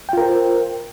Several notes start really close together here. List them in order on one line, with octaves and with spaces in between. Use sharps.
G5 F4 A#4 C5